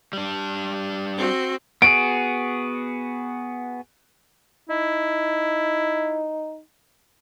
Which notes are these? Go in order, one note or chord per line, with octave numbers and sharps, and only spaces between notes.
G3 D4
C4 F#4
B3 F#4 G#4 D7
D#4 E4